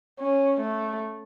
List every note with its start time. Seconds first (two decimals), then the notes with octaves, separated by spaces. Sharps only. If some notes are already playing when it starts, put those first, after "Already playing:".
0.19 C#4
0.60 A3